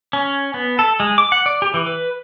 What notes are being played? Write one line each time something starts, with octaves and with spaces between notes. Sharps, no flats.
C#4
B3
A4
G#3
D6
F#5
D5
G4
E3
B4